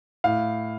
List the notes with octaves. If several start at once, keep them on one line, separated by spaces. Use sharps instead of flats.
A2 F5